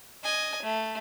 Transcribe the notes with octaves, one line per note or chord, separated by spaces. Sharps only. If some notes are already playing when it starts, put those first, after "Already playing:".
D#5 G#5
A3